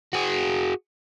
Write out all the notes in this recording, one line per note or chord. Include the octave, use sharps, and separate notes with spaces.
F#4 G#4